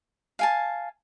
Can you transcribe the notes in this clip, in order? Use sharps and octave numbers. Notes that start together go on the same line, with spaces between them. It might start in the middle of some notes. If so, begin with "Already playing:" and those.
F5 G#5 A5